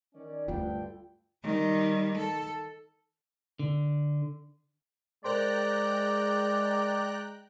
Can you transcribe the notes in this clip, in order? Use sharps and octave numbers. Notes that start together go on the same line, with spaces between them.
D#3 C#4 D5
D2 G2 D3 C#4 F4 G5
D#3 G3
A4
D3
G#3 A#4 C5 D5 G5 A#5 C6 F#6